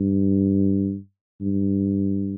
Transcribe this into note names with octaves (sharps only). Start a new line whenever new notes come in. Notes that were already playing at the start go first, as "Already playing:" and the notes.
Already playing: G2
G2